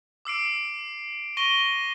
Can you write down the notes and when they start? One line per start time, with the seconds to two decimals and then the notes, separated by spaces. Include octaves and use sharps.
0.25 D6 E6 C7 D7
1.37 C#6 A#6 D#7 G7